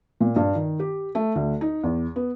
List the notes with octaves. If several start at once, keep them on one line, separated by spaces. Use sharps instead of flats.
A#2
G2
D#3
G4
A3
D2
D#4
E2
B3